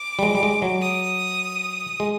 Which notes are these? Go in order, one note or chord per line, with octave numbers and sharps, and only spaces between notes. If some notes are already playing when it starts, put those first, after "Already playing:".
Already playing: D6
G3
G#3
G3
G#3
F#3
D#6
G#3